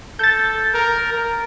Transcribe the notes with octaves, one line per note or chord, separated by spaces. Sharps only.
A4 G6 A6
A#4
A#4